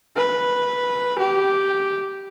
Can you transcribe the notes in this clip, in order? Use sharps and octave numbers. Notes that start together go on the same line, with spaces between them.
B4
G4